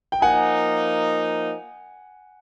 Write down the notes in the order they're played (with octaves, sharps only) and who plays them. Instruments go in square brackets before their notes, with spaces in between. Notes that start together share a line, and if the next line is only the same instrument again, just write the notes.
[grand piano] G5
[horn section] F3 A#3 D#4 [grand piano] F#5 G#5